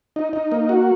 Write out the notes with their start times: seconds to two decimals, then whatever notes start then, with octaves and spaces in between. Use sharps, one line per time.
0.16 D#4
0.33 D#4
0.52 A#3
0.69 F#4